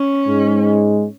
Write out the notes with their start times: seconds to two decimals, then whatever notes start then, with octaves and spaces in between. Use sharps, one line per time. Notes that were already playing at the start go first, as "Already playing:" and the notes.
Already playing: C#4
0.27 G#2 G#3